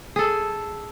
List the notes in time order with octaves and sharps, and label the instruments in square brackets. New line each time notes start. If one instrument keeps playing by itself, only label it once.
[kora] G#4 A4